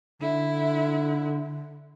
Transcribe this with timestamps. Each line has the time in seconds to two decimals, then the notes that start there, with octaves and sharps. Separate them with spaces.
0.21 D3 E4